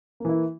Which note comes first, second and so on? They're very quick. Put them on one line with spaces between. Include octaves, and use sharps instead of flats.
A#3 E3 E4